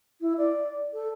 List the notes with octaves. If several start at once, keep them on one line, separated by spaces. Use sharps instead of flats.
E4
D5
A4